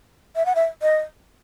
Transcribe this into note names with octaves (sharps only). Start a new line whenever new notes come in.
E5
F#5
E5
D#5